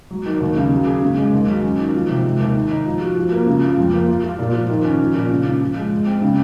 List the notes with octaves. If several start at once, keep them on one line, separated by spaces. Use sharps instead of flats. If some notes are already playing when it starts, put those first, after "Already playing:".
F#3
D#3
D#2
C#3
F#3
G#4
C#3
G#3
D#2
F#3
C#4
D#3
F3
C3
G#3
D#2
D#3
D#4
F3
F#4
F3
A#3
C#3
F4
F2
A#3
F4
F4
A#2
F3
D#3
C#4
F3
A#2
C#3
C#3
F3
G#3
G#3
C4
C#3